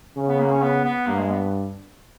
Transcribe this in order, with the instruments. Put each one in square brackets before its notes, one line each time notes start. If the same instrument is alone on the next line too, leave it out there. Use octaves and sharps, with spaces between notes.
[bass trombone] C#3 [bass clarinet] C#4
[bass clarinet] B3
A#3
C#4
B3
B3
[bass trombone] G2 [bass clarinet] A#3
[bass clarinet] G#3
B3